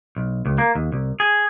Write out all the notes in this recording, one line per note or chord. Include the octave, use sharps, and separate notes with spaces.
B1
C#2
A#3
D#2
C2
G#4